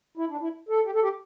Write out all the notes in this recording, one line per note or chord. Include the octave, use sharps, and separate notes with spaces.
E4
D4
E4
A4
G4
A4
G4